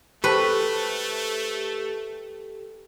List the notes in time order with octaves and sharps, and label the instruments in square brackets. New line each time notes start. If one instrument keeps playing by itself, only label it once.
[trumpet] A3 [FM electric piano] G4 A4 [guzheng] B4 [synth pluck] C5 A5 C#6